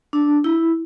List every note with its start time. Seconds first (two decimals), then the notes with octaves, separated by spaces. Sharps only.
0.13 D4
0.44 E4